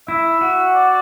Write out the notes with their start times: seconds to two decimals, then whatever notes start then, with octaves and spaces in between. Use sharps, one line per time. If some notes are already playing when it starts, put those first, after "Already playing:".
0.08 E4 E5
0.41 F#4
0.74 D5